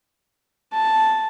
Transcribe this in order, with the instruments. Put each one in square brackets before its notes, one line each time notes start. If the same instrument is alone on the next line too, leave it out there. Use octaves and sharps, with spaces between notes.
[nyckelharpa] A5